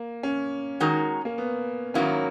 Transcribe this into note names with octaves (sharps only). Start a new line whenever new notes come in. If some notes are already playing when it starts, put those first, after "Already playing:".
Already playing: A#3
C#4
D#3 G#3 D#4 F#4 A#4
A#3
B3
G#2 D#3 F#3 A#3 C#4 E4